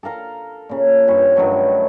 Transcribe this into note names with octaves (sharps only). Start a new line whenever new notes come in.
A4 A#4 F5 A#5
A#2 C#3
G2 C#4 B4 C5
G2 D#3 F#3 A3